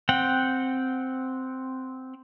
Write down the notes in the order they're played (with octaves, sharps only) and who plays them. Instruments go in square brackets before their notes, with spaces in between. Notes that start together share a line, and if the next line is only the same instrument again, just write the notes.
[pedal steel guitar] C4 F#5 G5